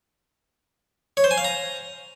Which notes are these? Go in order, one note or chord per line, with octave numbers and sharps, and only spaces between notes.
C#5
C5
G#5
F5
A#5